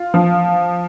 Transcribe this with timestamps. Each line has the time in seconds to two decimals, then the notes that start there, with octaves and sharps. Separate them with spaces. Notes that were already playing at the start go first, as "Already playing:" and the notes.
Already playing: F4
0.14 F3